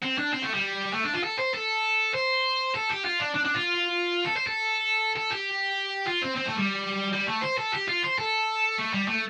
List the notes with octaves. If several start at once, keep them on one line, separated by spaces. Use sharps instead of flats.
C4
D4
C4
A3
G3
A3
D4
F4
A4
C5
A4
C5
A4
G4
F4
D4
D4
D4
F4
A4
C5
A4
A4
G4
F4
C4
C4
A3
G3
G3
A3
C5
A4
G4
F4
C5
A4
A3
G3
A3